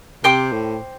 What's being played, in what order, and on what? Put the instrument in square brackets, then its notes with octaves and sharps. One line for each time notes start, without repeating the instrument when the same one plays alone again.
[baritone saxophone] C3 [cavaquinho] C5 G5 D6
[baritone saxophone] A2